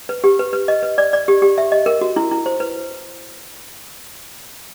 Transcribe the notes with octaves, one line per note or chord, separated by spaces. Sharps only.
B4
G4
B4
B4
D#5
B4
D5
D5
G4
G4
E5
D#5
A#4
F#4
E4
E4
C5
B4